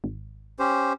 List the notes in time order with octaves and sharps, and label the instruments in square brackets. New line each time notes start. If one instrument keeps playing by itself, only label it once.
[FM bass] G#1
[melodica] C#4 G4 C5